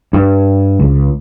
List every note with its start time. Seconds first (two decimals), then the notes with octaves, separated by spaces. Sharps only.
0.13 G2
0.79 C#2